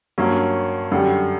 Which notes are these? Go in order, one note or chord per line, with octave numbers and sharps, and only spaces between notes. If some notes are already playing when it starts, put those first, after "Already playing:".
G2 F#3 A#3 C#4
F#2 D3 G3